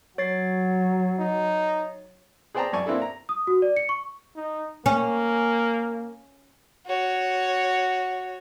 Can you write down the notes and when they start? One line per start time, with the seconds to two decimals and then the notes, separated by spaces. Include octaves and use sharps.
0.18 F#3 C#5 A6 C7
1.19 D#4
2.54 G#4 C5 D5 G5 A5 A#5
2.73 F#2 D5 G#5 A5 C#6
2.86 A#3 C4 D4 E4 A4
3.01 A#5
3.29 D#6
3.47 F#4
3.62 D5
3.77 C#7
3.89 C#6
4.36 D#4
4.86 A#3 C#4
6.87 F#4 C#5